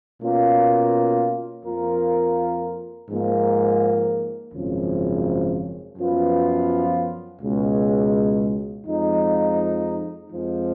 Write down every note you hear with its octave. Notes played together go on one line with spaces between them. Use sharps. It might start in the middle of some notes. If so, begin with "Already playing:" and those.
B2 A#3 C#4 F4
F2 F3 A#3 F4 A#4
G#2 F3 A#3
G#1 F#2 C#3 F3
F#2 F3 B3 F4 B4
C#2 B2 G#3
F2 F3 G#3 D#4
F2 F3 G#3